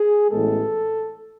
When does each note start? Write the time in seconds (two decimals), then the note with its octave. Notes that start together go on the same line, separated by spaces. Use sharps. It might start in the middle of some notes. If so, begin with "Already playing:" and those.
Already playing: G#4
0.31 A1 A2 G#3 B3 A4